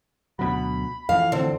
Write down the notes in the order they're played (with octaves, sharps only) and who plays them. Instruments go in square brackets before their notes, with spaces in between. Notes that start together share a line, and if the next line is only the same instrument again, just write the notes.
[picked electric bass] D2 B2 F#3 [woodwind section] B5
[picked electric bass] F2 E3 [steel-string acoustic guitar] F5
[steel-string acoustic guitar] D3 C4